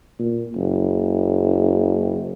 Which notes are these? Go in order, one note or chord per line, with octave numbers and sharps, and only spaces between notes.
A#2
F#1